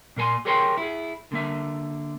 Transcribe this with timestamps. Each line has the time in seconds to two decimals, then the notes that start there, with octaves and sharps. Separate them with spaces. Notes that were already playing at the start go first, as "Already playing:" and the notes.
0.16 A#2 A#3 A#4 G#5 C6
0.45 G4 G#4 A#4 C#5 G5 C6
0.77 E4 G#4
1.32 D3 A#3 E5